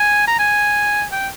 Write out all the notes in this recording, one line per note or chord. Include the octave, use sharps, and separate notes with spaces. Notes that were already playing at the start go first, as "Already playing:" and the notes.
Already playing: G#5
A#5
G#5
G5